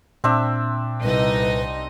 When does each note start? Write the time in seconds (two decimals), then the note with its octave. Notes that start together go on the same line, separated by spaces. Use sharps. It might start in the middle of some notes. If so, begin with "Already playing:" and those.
0.24 A#2 C4 D4 E5
1.03 C2 D#4 B4 D#5